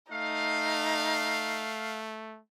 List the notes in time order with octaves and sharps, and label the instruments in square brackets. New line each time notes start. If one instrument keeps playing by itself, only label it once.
[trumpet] A3 [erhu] D#4 [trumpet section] F5